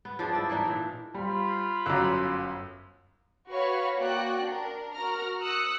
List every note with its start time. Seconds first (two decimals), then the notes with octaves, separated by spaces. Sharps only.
0.05 B3
0.19 F3 D4 G#4
0.33 E4 D5
0.49 E3 A#3 D4 D#4
0.65 A#2 E3
1.14 G3 F4 C5 B5
1.86 G1 F#2 D6 E6 F#6
3.51 F#4 B4 C#5 F5 B5 C#6
3.98 A#3 F#4 D5 G5 F#6
4.44 D4 A#4
4.93 F#4 A#4 A#5 F6
5.41 D#6 E6 F#6 C#7